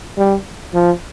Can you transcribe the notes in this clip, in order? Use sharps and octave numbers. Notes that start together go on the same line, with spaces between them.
G3
F3